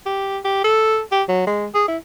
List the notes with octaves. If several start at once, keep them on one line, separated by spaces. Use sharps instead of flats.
G4
G4
A4
G4
F#3
G#3
G#4
E4